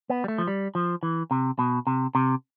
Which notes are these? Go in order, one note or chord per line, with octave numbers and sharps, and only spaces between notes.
B3
G3
A3
F3
G3
F3
E3
C3
B2
C3
C3